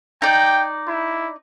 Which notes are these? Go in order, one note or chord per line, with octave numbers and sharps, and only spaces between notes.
D#4 D5 G5
E4